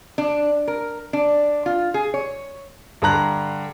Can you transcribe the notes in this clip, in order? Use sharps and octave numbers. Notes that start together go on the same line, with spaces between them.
D4
A#4
D4
F4
G#4
C#5
G2 D3 A#5 F#6